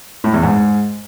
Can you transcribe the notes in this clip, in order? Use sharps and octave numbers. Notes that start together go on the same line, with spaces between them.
A2
E2
G#2